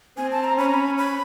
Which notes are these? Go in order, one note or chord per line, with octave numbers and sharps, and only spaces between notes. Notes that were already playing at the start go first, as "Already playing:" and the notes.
C4 G#5
A5
A#5
C#4 B5
A#5
B5
B5